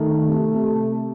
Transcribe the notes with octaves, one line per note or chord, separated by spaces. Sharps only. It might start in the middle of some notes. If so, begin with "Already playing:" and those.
Already playing: D#3 A3
C3
C3